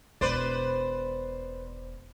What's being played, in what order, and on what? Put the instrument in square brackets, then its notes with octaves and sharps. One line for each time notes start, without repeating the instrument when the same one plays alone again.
[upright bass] E1 [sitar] B4 C5 D5